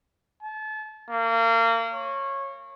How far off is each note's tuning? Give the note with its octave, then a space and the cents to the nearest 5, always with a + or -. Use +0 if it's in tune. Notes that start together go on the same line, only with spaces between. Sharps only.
A5 -35
A#3 -30
C#5 -20